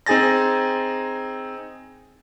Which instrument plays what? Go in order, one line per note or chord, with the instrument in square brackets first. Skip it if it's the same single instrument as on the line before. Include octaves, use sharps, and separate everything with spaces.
[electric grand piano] C4 D#4 G#4 G#5 A6 A#6